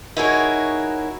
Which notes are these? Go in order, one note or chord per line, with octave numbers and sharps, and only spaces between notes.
D#4 E4 F#4 G#4 A#4 C#5